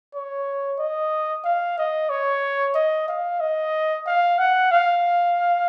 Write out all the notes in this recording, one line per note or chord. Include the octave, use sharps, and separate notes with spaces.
C#5
D#5
F5
D#5
C#5
D#5
F5
D#5
F5
F#5
F5